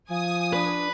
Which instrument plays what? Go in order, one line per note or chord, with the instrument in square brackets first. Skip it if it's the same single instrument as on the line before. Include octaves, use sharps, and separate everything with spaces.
[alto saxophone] F3 [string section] G#5 D#6
[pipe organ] D4 [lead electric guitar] B4